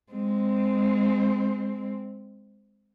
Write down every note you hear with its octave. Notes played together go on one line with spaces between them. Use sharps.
G#3 C4